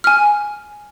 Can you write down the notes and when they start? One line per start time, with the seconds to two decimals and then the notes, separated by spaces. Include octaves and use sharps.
0.04 G#5 F6